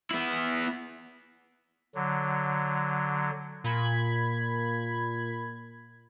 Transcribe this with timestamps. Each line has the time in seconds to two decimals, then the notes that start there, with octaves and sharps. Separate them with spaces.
0.11 B3 E4
1.95 D3 F#3
3.64 A#2 B5 G#6